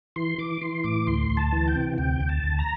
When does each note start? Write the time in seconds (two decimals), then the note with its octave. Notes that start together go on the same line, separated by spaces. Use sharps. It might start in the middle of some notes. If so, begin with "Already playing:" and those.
0.16 E3 C6
0.38 E3 D6
0.61 E3 C6
0.84 A2 D6
1.07 D2 C6
1.30 D2
1.37 A5
1.52 E3
1.68 G5
1.75 C3
1.98 D2 G5
2.20 D2
2.29 A5
2.43 D2
2.59 A#5